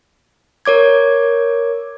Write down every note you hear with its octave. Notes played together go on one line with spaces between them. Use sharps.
A#4 C#5 D6 G#6